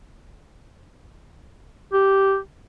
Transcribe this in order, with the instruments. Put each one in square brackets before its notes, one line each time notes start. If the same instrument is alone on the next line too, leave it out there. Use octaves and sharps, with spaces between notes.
[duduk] G4